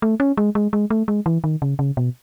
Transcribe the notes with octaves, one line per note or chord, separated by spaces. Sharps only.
A3
C#4
G#3
G#3
G#3
A3
G#3
E3
D#3
C#3
C#3
B2